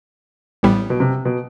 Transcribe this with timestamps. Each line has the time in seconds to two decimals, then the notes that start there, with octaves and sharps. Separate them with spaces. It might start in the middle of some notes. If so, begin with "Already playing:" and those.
0.63 A1 A2 G3 B3
0.90 B2
1.00 C3
1.25 B2